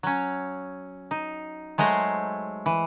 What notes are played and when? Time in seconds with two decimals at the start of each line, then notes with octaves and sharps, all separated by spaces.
0.03 F#3 C#4
1.11 D#4
1.78 F#3 G#3 A3 C5 A#5
2.66 E3